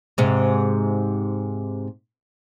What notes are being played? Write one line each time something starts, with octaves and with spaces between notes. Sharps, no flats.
G#2 C3